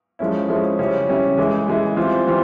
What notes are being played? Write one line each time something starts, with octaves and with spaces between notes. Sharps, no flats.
F3 G#3 C#4 E4
F3 G#3 C#4 E4
C#3 G3 C#4 E4
C#3 G3 C#4 E4
E3 G#3 E4
E3 G#3 E4
E3 G3 C4 F4
E3 G3 C4 F4